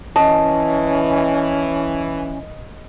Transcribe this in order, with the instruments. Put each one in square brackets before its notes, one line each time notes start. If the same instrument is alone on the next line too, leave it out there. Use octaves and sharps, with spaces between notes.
[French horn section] E3 [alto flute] C#4 [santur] D#5 [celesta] A5